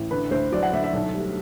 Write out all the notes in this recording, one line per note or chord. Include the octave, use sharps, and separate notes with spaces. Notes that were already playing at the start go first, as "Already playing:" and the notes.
Already playing: A1
D3 B4
D2 C5
F#3 D5
F#5
D2 E5
E5
B1
G3